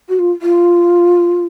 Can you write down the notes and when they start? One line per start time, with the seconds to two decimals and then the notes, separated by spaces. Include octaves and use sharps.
0.09 F#4
0.19 F4
0.42 F4